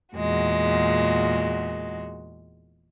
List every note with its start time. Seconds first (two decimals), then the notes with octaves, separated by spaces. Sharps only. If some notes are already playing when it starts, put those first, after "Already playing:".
0.15 E2 A#2 G#3 F#4